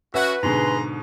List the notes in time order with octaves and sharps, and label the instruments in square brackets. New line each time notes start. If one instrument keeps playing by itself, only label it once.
[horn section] C#4 F#4 [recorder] B4 [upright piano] E5
[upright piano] G#2 B2 D3 [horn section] G#4 A#5 C6